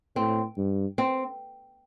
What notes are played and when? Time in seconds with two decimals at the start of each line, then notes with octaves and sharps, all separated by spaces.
0.16 A2 C4
0.57 G2
0.98 C4